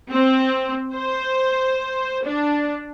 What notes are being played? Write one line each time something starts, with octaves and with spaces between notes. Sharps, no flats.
C4
C5
D4